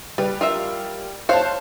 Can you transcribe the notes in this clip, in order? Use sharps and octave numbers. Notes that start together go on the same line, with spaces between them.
G3 B4
F4 A#4 E5
C5 C#5 F5 F#5 A5